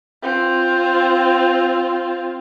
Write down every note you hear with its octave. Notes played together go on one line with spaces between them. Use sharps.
C4 F4